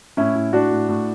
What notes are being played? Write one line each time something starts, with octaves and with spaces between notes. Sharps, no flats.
A2 C#4 E4
A2
A2 D4 F#4
A2
A2